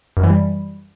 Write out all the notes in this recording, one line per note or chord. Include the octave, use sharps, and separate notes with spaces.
F#2
E3
G3